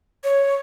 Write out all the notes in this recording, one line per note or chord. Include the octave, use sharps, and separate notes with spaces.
C#5